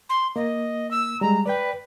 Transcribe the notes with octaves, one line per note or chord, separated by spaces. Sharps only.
C6
A#3 D#5
E6
G3 G#3 A#5
B4 D5 G5